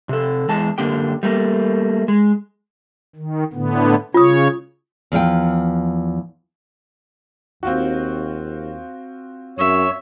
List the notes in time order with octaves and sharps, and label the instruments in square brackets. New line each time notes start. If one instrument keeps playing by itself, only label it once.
[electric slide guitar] C3 A4
E2 G#3 A5
F#2 D3 A#3 G4 G5
G3 A3 A#3
G#3
[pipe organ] D#3
A2 D3 B3
[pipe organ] C#3 C#5 [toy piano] F4 D#6
[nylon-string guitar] E2 F3 E5 G5
[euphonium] D#2 [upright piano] C4 F4 F#4
[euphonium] F#2 [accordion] C#5 [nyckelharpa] E5